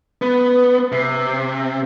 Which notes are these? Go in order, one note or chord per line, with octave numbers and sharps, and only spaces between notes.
B3
C3